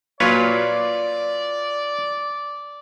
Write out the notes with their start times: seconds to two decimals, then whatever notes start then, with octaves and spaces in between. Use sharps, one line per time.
0.20 A#2 F#3 F4 B4 C#5 D5